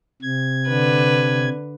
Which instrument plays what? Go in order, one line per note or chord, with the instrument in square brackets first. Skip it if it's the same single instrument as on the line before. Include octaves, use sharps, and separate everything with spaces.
[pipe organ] C3 G#6
[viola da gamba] D3 B4